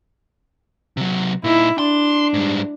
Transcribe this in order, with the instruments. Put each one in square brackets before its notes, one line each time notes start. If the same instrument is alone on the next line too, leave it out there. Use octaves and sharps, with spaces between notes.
[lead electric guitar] C3 F#3
[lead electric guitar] A#2 D#4 [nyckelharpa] E4
[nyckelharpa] D4 [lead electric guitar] C6
[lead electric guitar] G#2 G3